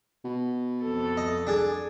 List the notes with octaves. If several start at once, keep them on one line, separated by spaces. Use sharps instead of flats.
B2
F2 A4
D#5
D4 G#4